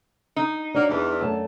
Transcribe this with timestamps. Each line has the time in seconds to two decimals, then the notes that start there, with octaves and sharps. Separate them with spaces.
0.36 D#4
0.74 A#3 D4 F#4 C#5
0.89 E2 D5
1.20 F#2 A3 A5